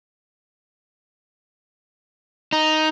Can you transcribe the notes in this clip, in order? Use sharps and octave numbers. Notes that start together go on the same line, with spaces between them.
D#4